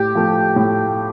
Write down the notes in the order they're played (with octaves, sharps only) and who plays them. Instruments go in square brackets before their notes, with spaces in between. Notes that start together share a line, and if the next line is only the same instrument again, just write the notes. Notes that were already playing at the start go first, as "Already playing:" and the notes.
Already playing: [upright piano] A2 [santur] G4
[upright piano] F3 A3
A2